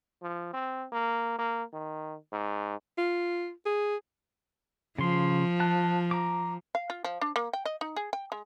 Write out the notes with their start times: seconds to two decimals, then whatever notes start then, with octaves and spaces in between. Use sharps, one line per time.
0.22 F3
0.53 C4
0.92 A#3
1.39 A#3
1.73 D#3
2.32 G#2
2.98 F4
3.66 G#4
4.98 C#3 F3 C6
5.60 A5 F#6
6.11 A#5 D6
6.75 F5
6.90 F4
7.04 F3
7.21 D4
7.36 A#3
7.53 G5
7.65 D#5
7.81 D#4
7.96 G#4
8.13 G5
8.32 G#3